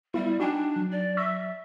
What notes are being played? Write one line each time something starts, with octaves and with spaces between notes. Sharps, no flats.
G3 B3 E4 E5
D4 D#4 F#4 G5 G#5 D6
F#3
D5
E5 C#6 E6 A#6